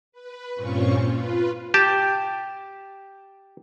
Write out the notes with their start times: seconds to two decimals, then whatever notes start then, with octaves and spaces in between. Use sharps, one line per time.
0.12 B4
0.55 G2 A#2 C4 C#4 F4 C#6
1.06 F4 B4
1.74 G4 G5 A5